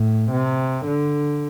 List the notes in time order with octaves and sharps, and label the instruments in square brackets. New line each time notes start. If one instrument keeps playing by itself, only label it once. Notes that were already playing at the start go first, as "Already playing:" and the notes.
Already playing: [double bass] A2
C3
D3